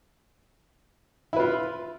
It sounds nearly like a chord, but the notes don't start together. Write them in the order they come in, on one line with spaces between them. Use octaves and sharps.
E4 B4 F4